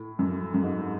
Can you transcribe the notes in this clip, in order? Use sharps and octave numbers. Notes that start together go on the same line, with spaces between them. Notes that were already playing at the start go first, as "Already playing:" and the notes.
Already playing: A2
F#2
F#2
G#2